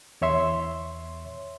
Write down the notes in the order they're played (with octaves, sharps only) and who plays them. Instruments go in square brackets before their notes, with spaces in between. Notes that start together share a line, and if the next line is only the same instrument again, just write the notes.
[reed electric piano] E2 C#5 E5 C6